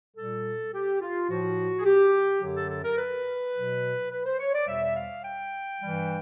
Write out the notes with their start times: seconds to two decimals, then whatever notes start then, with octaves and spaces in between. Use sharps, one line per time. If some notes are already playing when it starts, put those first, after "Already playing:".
0.16 A#2 G3 A4
0.74 G4
1.01 F4
1.29 A2 F3 F#4
1.79 G#4
1.86 G4
2.41 F#2 D3 F#3
2.56 A4
2.70 A4
2.84 A#4
2.98 B4
3.54 B2 F#3
4.11 B4
4.26 C5
4.39 C#5
4.54 D5
4.68 E2 B2 G3 E5
4.96 F5
5.24 G5
5.80 G2 E3 G3